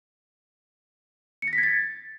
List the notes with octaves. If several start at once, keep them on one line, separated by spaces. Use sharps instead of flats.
C#7
A#6
B6
G#6
A6